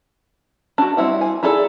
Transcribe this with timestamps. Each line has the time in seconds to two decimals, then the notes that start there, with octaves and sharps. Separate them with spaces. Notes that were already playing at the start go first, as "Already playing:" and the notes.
0.78 D4 F#4
0.97 G3 C4 E4 F#5
1.21 G#5
1.43 D#4 E4 G#4 A4 D5